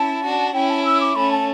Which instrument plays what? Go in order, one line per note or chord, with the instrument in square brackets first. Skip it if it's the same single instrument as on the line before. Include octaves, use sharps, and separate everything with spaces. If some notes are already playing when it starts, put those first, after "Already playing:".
Already playing: [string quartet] C#4 E4 [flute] A5
[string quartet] D4 F#4
[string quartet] C#4 E4 [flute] G5
[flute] A5
E6
D6
[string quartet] A3 C#4 [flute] B5
[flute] A5